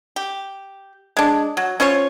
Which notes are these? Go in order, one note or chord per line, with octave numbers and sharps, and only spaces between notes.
G4
G#3 D4
F#3
C#4 F4 C5 C#5